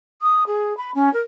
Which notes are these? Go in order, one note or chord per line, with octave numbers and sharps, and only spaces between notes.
D#6
G#4
B5
C#4
A#4